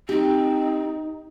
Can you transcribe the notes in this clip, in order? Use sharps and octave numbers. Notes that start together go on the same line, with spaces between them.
C4 D#4 G4